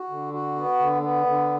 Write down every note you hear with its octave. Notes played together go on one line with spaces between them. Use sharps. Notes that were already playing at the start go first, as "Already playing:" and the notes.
Already playing: F#4
D3
F#4
B3
D3
B3
D3